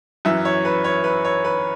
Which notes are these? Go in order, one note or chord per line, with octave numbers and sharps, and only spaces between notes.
F#2 E3 E5
C#5
B4
C#5
B4
C#5
B4